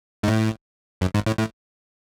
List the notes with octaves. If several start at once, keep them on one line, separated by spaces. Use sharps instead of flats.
G#2
A2
F#2
G#2
A2
A2